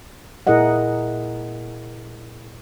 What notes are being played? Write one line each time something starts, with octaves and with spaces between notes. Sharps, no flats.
A#2 E4 G#4 A#4 D#5 F#5